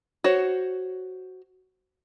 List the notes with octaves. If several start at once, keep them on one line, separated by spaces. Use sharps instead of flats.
F#4 C5 C#5